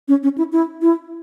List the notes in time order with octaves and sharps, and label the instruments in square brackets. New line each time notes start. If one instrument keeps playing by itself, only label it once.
[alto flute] C#4
C#4
E4
E4
E4